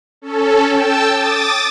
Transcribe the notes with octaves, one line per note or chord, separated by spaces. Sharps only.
C#4 A4
G5 A5 E6
D6 D#6 A6